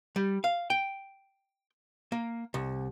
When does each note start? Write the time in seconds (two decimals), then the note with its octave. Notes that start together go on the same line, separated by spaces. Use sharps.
0.16 G3
0.44 F5
0.70 G5
2.12 A#3
2.54 C2